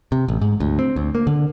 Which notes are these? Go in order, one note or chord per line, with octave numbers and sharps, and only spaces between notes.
C3
A1
G#2
D2
C4
D2
A#3
D3